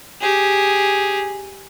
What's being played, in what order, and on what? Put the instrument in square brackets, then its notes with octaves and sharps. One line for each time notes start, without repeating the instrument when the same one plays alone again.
[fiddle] G4 G#4